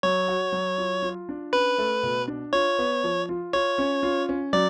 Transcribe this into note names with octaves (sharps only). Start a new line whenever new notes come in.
F#3 C#5
F#4
F#3
F4
F4
D4
C#4 B4
A3
B2
D4
F4 C#5
B3
F3
F4
F4 C#5
C#4
F4
C#4
F#3 D5